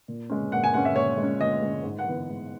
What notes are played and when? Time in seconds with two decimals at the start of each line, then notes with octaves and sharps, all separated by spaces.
0.08 A#2
0.30 G#3 C#4
0.52 A#2 F#5
0.64 G#5
0.74 G#3 C#4 F#5
0.85 E5
0.96 A#2 C#5
1.18 G#3
1.23 C#4
1.40 A#2 D#5
1.62 G#3 C#4
1.84 G#2
1.98 F#5
2.07 E3 B3
2.29 G#2